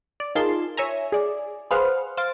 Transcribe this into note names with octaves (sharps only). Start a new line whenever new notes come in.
D5
D#4 F4 G#4 A#4 A5 C6
C#5 E5 G#5 A#5
G#4 D5
G#4 B4 C5 F5 F#5
C5 F5 A6 D7